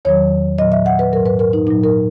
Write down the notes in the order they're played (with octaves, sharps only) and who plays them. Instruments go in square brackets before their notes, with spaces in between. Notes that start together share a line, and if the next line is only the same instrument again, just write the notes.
[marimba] E2 D#3 F#3 C#5
A#2 F#3 D#5
E5
F#5
B4
G#2 F#3 A#4
B4
A#4
D#4
A#2 F#3 D#4
A#4